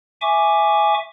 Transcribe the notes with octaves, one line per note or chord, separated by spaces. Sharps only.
E5 G#5 C#6 D6